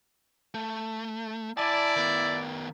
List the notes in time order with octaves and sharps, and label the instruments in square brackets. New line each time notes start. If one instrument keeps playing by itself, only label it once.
[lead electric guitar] A3
[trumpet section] E4 D5 [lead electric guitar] G#5 A5
[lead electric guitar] D#3 B3